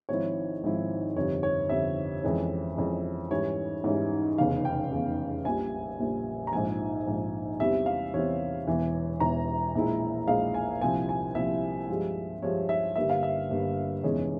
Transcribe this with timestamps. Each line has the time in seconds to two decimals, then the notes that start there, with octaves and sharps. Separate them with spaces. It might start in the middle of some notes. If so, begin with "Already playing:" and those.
0.09 G#1 G#2 F3 C4 E4 C#5
0.63 G#1 G#2 F3 C4 E4
1.16 G1 F2 C3 G3 C#5
1.43 C#5
1.69 G1 F2 C3 G3 E5
2.23 F2 E3 G#3 C#4
2.77 F2 E3 G#3 C#4
3.31 G#2 E3 G3 C#4 C#5
3.84 G#2 E3 G3 C#4
4.38 F1 E2 C#3 F5
4.65 G5
4.91 F1 E2 C#3
5.45 A#1 A#2 G3 G#5
5.98 A#1 A#2 G3
6.47 A#5
6.53 A#1 G#2 F3 G#5
7.06 A#1 G#2 F3
7.60 E2 C3 E3 G3 C4 E5
7.86 F5
8.14 E2 C3 E3 G3 C4 C#5
8.67 E1 E2 E3
9.20 E1 E2 E3 A#5
9.75 A#1 A#2 G#3 E4
10.27 A#1 A#2 G#3 E4 F5
10.54 G#5
10.81 C2 A#2 F3 C4 E4 G#5
11.09 G#5
11.35 C2 A#2 F3 C4 E4 E5
11.89 G2 F3 G#3
12.42 G2 F3 G#3 C#5
12.69 E5
12.95 G1 G2 G3 A#3 E5
13.10 F5
13.23 E5
13.50 G1 G2 G3 A#3
14.04 F1 E2 E3 G#3 C#4